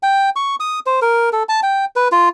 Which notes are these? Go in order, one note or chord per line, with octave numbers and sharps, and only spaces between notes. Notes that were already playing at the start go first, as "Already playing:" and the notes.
G5
C#6
D#6
C5
A#4
A4
A5
G5
B4
F4